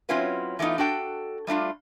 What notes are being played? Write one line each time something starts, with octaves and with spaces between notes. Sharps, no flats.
F#3 C4 C#4 E4 F4 B4
E3 A3 B3 D#4 F4
D4 F#4 A4 G5
G3 A3 D4 F4